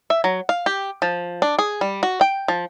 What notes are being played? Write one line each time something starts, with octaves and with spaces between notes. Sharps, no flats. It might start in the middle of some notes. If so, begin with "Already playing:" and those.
E5
F#3
F5
G4
F3
D4
G#4
G3
F#4
G5
F3